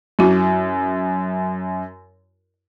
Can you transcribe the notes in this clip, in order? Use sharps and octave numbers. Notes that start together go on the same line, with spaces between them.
F#2 E4 F#4